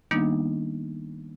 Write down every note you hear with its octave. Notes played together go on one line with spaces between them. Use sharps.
D#3 G3 A#3 B3 D4 D#4